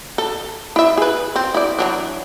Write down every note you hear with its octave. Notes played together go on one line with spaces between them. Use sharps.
A4
E4 E5
G#4 B4
C4
E4 D5
E3 F#3 D4